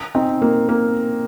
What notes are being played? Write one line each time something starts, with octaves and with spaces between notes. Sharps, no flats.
C4 D#4
A#3
A#3